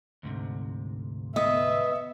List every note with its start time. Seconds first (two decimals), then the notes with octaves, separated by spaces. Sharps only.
0.23 D2 G#2 C3
1.36 B3 D#5 E5 D#6